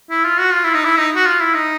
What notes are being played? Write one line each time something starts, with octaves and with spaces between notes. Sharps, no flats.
E4
F4
F#4
F4
E4
D#4
E4
D#4
F#4
F4
E4
D#4